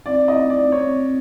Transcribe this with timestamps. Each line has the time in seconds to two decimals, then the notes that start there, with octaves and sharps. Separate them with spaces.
0.06 C4 D5
0.28 D#5
0.50 D5
0.72 C#5